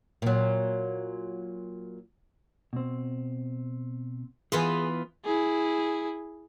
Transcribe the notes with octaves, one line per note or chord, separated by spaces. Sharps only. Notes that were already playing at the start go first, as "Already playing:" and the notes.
A#2 F#3
B2 C4
E3 B3 F4 G#4 G#5
E4 G#4